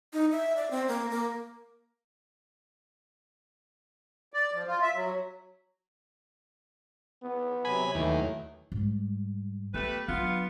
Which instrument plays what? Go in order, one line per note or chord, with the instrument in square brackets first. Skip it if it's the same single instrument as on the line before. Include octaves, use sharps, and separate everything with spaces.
[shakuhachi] D#4
E5
D5
C4
A#3
A#3
[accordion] D5
F3
F4
E5
F#3
[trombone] B3
[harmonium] C3 F#3 [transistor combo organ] G#5 B5
[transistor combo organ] D#2 [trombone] E3 [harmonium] F#3 A3
[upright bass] G#2 G3
[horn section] A3 G4 B4 [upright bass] B3
[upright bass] F#3 D4 [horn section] B3 F4